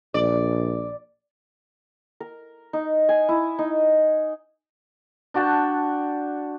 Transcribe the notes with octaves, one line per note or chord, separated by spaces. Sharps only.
A#1 D5
A#4
D#4
G#5
E4
D#4
D4 F#4 G5 A5